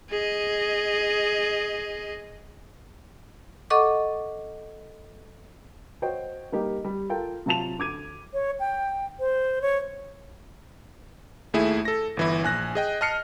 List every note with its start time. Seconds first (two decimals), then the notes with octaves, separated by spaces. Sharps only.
0.10 G#4 D#5
3.70 A4 D#5 F#5 C#6 D6
6.02 F#4 C5 C#5 D#5 G5
6.52 G3 A#3 D#4 G4
6.85 G3
7.09 F4 A4 A#4 G5
7.46 C3 F#3 F4 A5 E7 F7
7.79 D2 D6 G#6 D#7
8.34 C#5
8.60 G5
9.19 C5
9.62 C#5
11.54 D#2 A3 E4 G#4 E5
11.85 A4 A#6
12.17 G1 E3 E4
12.43 A#1 G#5 F#6 A#6
12.75 G#4 D#5 G5
13.01 D#5 A5 F6 C7 C#7